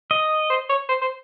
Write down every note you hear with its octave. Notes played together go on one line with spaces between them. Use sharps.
D#5
C5
C#5
C5
C5